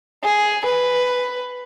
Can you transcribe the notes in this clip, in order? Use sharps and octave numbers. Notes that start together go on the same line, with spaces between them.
G#4
B4